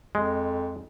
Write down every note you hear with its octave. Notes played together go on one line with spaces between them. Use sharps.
F2 G#3